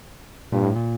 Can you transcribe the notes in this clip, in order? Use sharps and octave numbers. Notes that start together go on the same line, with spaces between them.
G2 A#2
A2
A#2